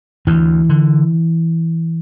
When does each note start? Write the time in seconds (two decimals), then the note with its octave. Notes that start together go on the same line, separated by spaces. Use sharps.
0.27 D2 E3
0.69 D3